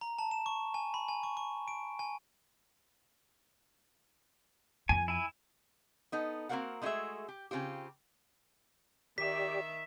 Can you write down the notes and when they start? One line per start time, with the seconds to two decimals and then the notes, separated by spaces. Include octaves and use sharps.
0.01 A#5
0.19 A5
0.31 E7
0.46 C#6
0.74 G#5
0.94 B5
1.08 G#5
1.23 C#6
1.37 C#6
1.68 D7
1.99 G#5
4.89 F2 G#5
5.08 E4 G#5
6.12 B3 D#4 A4
6.49 A#3 C4 F#4 A#4 F5 F#5
6.82 G#3 A3 D#4 F#4 G#4 E5
7.28 G4
7.51 C#3 C4 F4 G4
9.18 D#3 G4 D5 E5 B6